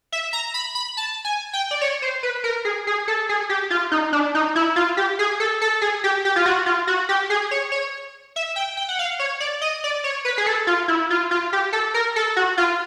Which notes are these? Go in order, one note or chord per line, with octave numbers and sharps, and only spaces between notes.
E5
A#5
B5
B5
A5
G#5
G5
D5
C#5
C5
B4
A#4
G#4
G#4
A4
G#4
G4
F4
D#4
D4
D#4
E4
F4
G4
G#4
A4
A4
G#4
G4
G4
F4
F#4
F4
F#4
G4
G#4
C#5
C#5
E5
G5
G5
F#5
F5
C#5
D5
D#5
D5
C#5
B4
G#4
A4
F4
E4
F4
F4
G4
A4
A#4
A4
F#4
F4